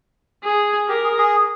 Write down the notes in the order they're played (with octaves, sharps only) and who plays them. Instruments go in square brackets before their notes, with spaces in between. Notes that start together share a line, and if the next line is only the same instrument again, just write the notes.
[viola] G#4
[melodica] G4 [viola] A#4
[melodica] G#4
G#4